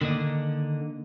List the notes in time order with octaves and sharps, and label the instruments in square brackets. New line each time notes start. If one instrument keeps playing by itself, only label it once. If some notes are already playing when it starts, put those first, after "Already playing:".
[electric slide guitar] D3 [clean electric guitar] D#3 A#3 D#5